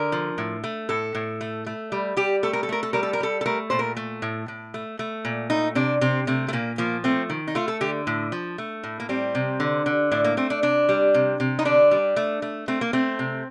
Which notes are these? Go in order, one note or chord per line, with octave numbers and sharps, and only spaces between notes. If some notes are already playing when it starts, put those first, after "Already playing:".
Already playing: D3 A#4
F3
A2
A3
A2 A4
A2
A3
A3
G3
G3 G4
A3 A4
A#4
A4
A3 A#4
A4
G3 A#4
A4
A#4
G3 A4
A4
A3 A#4
A#2 C5
A#4
A3
A2
A2
A3
A3
A#2
A3 D#4
C3 D4
C3 C4
C3 A3
A3
A#2 A#3
F3 A#3
A3 C4
D#3
D#4
A3 F4
A4
D3 G4
A2
F3
A3
A2
A#3
G3 C4
C3
D3
D3
A2 D4
A#3
A3 C4
D4
C3 D4
G3
C3
C3
D#4
D3 D4
G3
A3
A3
A3 C4
A#3
A3 C4
C3